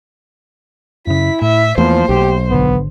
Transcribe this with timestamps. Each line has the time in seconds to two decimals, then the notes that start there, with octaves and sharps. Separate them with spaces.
1.07 F#2 C#3 E4 B6
1.42 A2 E5
1.78 E2 F3 A3 A#3 C5
2.09 B1 G4
2.50 G#1 D3 B3